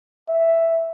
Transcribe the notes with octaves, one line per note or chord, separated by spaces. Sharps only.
E5